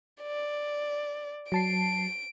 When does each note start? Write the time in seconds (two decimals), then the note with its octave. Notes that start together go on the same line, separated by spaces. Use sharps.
0.22 D5
1.52 F#3 A5 C7 D7